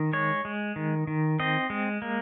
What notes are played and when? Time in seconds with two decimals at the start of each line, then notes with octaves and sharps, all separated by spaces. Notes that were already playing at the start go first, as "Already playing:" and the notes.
Already playing: D#3
0.13 G#3 C#5
0.45 G#3
0.76 D#3
1.07 D#3
1.40 C4 D#5
1.70 G#3
2.02 A#3